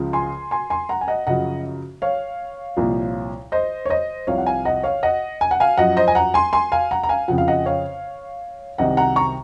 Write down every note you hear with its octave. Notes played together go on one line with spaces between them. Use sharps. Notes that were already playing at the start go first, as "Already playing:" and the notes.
Already playing: C#2 C#3 F3
G#5 C6
G#5 C6
G#5 C6
F#5 A#5
G#5
D#5 F#5
F#2 C#3 F3 D#5 F#5
C#5 F5
C2 A#2 F3
C5 D#5
C#5
C5 D#5
C2 C3 F3 C#5 F5
F#5
F5 G#5
D#5 F#5
C#5 F5
D#5 F#5
G#5
F#5
F5 G#5
F#2 F3 D#5 F#5
C5 D#5
G#5
F#5 A#5
G#5 C6
G#5 C6
F5 G#5
F#5 A#5
A#5
F5 G#5
F2 C#3 F3 F#5
F5
D#5 F#5
C#5 F5
C2 C3 D#3 D#5 F#5
F#5 A#5
A#5 C#6